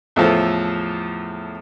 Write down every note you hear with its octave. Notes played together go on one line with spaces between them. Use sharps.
E2 A2 F3 A4